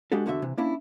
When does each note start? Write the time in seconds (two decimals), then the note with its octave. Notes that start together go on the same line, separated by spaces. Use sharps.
0.12 G#3 D4 F#4 G4 A4
0.26 E2 D3 F#4 D#5 E5
0.42 C3 E3
0.57 A#3 C#4 D4 E4